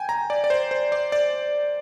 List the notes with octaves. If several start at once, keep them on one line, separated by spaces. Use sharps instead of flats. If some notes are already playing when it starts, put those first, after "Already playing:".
Already playing: G5 G#5
A#5
D5
D5
C5
C5
D5
D5